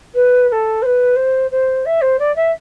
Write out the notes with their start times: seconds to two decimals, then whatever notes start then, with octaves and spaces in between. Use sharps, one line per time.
0.14 B4
0.49 B4
0.52 A4
0.82 C5
0.86 B4
1.16 C5
1.51 C5
1.85 E5
2.01 C5
2.19 D5
2.36 E5